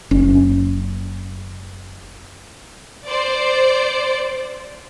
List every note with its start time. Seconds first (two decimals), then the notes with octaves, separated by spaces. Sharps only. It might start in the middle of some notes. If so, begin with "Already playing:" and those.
0.11 F#1 C#4
3.07 C5 D5